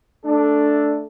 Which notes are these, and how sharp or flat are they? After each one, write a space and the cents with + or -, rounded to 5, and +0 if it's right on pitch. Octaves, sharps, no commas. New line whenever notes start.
A3 +0 D4 +0 A4 +0